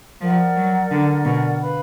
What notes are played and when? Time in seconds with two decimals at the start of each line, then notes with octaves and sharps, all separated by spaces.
0.21 F3 A#4 D5 F#5
0.56 F#3
0.91 D3
1.25 B2
1.60 B4 F5 B5